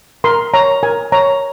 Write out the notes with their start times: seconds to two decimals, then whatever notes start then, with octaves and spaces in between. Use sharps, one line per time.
0.24 A#4 C6
0.54 C#5 A#5
0.83 A#4 G#5
1.12 C#5 A#5